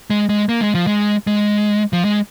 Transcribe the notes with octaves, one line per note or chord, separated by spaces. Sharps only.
G#3
G#3
A#3
G#3
F3
G#3
G#3
F3
G#3